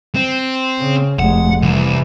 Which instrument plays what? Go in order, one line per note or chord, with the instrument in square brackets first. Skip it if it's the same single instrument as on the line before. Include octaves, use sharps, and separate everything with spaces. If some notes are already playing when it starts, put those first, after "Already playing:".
[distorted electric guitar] C4
[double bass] C#3
[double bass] F1 G#3 [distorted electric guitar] F#5
[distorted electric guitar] C2 [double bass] E3